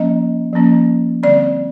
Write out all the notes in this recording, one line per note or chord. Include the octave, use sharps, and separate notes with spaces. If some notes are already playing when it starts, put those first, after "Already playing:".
Already playing: F3 A#3 C#4 D#5
F3 A#3 C#4
D3 G3 C4 D5